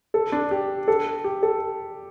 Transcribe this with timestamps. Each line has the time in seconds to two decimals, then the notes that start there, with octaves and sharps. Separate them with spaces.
0.14 A4
0.32 D4
0.51 G4
0.88 A4
1.24 G4
1.43 A4